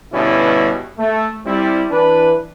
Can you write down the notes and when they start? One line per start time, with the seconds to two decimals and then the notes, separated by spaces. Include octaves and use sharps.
0.13 G2 B2 D3 G3 C#4 E4
0.98 A3
1.46 G3 C4 E4
1.91 E3 D4 B4